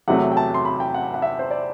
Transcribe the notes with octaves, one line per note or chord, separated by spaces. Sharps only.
E2 C3 F#3 A3 F#5
G5
A5
C6
B5
G5
F#5
F#5
E5
C5
D5